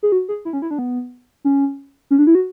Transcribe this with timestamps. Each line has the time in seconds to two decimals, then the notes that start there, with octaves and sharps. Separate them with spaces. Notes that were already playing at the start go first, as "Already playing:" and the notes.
0.03 G#4
0.12 F#4
0.29 G#4
0.45 E4
0.53 C#4
0.62 E4
0.71 D4
0.79 B3
1.45 C#4
2.11 C#4
2.19 D4
2.27 E4
2.35 F#4